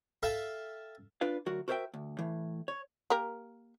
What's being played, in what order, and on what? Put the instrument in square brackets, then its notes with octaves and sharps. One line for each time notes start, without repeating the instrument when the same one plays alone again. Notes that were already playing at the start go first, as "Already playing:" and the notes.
[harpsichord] A4 E5 F5 G5 A5
[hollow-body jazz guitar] D4 F4 B4 F5
D2 F#3 F#4 A#4
F#4 A#4 C5 D5 E5 G5
D2
A2 E3
C#5
[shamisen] A#3 G4 A#4